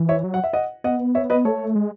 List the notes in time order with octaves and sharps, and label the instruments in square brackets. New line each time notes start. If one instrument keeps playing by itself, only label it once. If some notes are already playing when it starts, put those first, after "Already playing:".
Already playing: [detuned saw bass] E3
[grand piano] C#5 E5
[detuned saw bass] F#3
[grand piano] F#5
E5
D#5 F#5
[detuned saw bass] B3 [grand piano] D#5 F#5
[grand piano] C#5 E5
B4 D#5
[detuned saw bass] A3 [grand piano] A4 C#5
[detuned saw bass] G#3